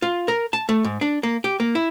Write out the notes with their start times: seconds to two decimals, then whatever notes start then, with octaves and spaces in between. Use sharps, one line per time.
0.02 F4
0.28 A#4
0.53 A5
0.69 A3
0.84 G#2
1.01 D4
1.23 A#3
1.44 G4
1.60 A#3
1.75 E4